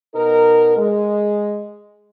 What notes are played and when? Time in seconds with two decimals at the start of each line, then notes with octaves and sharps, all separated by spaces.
0.15 B2 D#4 A#4
0.77 G#3